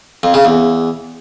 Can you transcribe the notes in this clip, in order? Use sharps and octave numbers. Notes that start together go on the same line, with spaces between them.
F2
C#3
E2